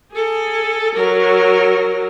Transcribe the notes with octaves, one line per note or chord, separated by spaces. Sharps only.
G#4 A4
F#3 A#4